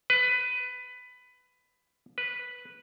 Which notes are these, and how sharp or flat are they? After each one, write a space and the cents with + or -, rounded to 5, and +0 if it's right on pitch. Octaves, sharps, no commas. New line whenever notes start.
B4 +15
B4 -5